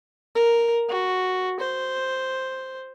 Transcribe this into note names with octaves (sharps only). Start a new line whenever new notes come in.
A#4
F#4
C5